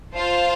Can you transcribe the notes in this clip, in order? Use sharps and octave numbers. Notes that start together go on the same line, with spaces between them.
F4 C5 F5 A5